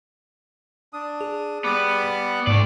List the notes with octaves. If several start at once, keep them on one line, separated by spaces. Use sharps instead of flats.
D4 D#6
G#4
G3 B3 D6
G#2 A3 D5